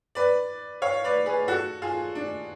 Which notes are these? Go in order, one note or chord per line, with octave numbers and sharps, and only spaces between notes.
B4 D5
C#5 F5
B4 D5
G#4 B4
F#4 A4
F4 G#4
D4